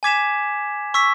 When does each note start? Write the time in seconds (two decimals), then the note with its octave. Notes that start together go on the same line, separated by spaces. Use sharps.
0.03 G#5 D6 G#6 B6 E7
0.94 C#6 E6 B6